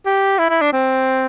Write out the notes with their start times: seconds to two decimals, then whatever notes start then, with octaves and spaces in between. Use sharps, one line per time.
0.06 G4
0.39 E4
0.50 E4
0.61 D4
0.73 C4